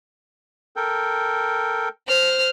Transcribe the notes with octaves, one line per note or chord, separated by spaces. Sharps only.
A4 A#4 G5
C5 F6